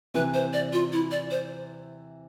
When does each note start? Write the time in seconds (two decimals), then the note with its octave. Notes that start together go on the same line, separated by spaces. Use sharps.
0.14 C3 E3 B4
0.34 C5
0.53 D5
0.73 F4
0.92 E4
1.11 D5
1.31 C5